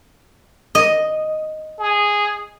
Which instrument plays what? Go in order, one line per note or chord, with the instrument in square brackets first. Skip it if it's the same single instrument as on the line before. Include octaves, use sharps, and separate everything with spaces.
[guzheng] D#5
[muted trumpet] G#4